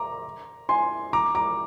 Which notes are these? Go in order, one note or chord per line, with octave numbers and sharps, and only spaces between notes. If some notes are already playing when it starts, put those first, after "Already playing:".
Already playing: A#5 D6
G#5 C6
A#5 D6
A#5 D6